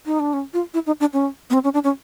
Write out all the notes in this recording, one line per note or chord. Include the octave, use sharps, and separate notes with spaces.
D#4
D4
C#4
F4
E4
D#4
D4
C#4
B3
C4
C#4
D4
C#4